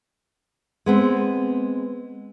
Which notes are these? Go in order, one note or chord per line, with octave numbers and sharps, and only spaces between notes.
G#3 B3 C4